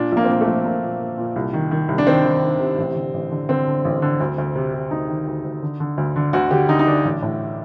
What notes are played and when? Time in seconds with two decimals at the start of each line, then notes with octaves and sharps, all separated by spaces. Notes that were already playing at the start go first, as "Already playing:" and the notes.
Already playing: A#2 D4
0.12 A#1 A#3
0.24 C4
0.29 A#2 A#3
0.41 A3
0.47 A#1
0.65 A#1 A#3
0.83 A#2
1.00 A#2
1.18 A#2
1.36 C2
1.53 D#3
1.71 D#3
1.88 C2
1.98 D4
2.07 D#3 C4
2.24 D#3
2.42 D#3
2.60 C3
2.78 A1
2.95 D3
3.14 A1
3.31 D3
3.49 D3 C4
3.67 D3
3.85 A1
4.02 D3
4.20 D2
4.38 D2
4.55 C3
4.74 C3
4.91 D2 D#4
5.09 D#3
5.27 D2
5.44 D2
5.62 D3
5.80 D3
5.97 D2
6.16 D3
6.33 D2 F#4
6.51 D3 G4
6.69 D3 D#4
6.79 D#4
6.87 D3 D4
7.04 A1
7.22 A2